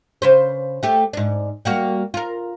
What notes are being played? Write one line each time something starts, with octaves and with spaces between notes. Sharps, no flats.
C#3 B4 C5
A3 G4
G#2 D4
G3 A#3 F#4
F4 A#4